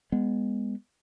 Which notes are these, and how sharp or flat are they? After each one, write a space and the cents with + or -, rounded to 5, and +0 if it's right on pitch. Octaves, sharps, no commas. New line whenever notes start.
G#3 -20 B3 +0